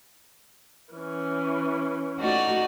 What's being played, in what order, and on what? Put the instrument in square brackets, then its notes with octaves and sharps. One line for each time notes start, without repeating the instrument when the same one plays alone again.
[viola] E3 C#4
[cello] A3 F#4 [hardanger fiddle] D#4 D5